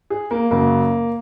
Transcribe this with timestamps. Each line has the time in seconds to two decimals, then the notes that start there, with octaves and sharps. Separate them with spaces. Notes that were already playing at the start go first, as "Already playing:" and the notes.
0.10 G#4
0.31 A#3
0.51 F#2 C#3 F#3 A#3